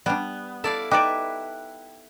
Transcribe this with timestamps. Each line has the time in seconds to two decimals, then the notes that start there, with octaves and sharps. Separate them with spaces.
0.06 G3 B3 D4
0.64 E4 A4 D5 F5
0.91 D#4 G4 B4 D5 E5 G5 D6